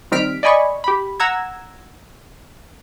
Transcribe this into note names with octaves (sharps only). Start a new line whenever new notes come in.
D#3 G3 C4 F6 B6 D7
D5 D#5 G#5 B5 C#6
G4 B5
F#5 A#5 E6 G#6